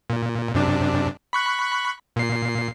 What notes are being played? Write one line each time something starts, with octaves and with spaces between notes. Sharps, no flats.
A#2
F#2 C3 D4
B5 C#6 F#6
A#2 C7